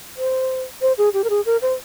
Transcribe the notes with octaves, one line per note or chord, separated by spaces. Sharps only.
C5
C5
G#4
G4
A#4
G#4
A#4
C5